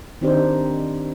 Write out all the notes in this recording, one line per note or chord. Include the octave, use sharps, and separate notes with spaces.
D#3 C4 D4 D#4 G4 C5